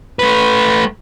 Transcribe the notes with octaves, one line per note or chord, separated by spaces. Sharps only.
A3 B4